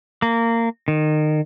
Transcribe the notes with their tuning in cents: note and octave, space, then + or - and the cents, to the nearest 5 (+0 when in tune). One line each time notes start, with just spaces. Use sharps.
A#3 -20
D#3 -25